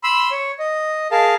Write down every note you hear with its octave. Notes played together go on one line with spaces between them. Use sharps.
B5 C6 E6
C#5
D#5
G#4 A#4 F5 A5